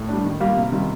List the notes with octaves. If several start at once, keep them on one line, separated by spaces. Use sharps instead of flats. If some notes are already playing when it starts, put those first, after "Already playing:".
Already playing: A2
G3 D4
D#3
G3 A#3 F4
C3
D#3 G3